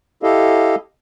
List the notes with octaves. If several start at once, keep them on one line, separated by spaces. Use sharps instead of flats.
E4 G4 A4 D#5 F5